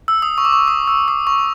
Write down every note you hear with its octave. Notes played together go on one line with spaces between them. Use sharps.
E6
D#6
C#6
D6
C#6
D#6
E6
D#6
C#6